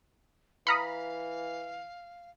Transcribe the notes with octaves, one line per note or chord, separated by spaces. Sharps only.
E3 F5 A#5 B5 D#6 F6 C#7